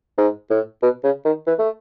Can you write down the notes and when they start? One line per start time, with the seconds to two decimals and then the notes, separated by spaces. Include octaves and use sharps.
0.18 G#2
0.50 A2
0.83 B2
1.04 C#3
1.25 D#3
1.47 E3
1.59 A3